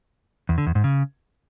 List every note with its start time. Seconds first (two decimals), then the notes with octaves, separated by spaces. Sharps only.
0.49 E2
0.58 D3
0.67 E2
0.75 G#2
0.84 C#3